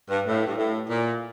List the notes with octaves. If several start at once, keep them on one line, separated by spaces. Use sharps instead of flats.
G2
A2
G2
A2
A#2